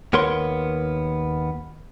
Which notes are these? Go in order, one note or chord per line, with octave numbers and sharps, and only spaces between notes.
D#2 B3 A#4 C#5 C6